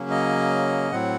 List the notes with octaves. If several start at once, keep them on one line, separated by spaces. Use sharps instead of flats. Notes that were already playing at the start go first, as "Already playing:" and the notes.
Already playing: C#3 F#3 A#3 C#4
D#5
A2 F#3 C4 F#5